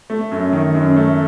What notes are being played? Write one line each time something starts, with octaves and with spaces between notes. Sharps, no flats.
A3
F#2
D#3
F#2
A3